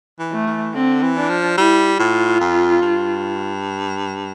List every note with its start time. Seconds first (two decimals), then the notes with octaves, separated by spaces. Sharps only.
0.19 E3
0.32 A3
0.47 E3
0.74 D3 C4
1.03 E3
1.17 D4
1.30 F3
1.58 G3 E4
1.99 A2 F4
2.40 F2
2.82 G2